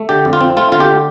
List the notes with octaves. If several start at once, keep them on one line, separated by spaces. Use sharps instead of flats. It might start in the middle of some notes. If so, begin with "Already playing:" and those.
Already playing: A3
D3 G4
F2
F4
C4
A3 F4
D3 F4
G4